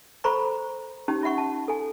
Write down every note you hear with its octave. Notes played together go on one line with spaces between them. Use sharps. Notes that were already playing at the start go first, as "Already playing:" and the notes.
A4 C5 A#5 B5 C#6
C#4 D#4 G4
F4 E5 F#5 C#6
A5
A4 G#5